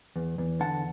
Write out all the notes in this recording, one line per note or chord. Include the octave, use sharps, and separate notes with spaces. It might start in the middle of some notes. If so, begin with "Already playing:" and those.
E2
E2
D3 F#5 A5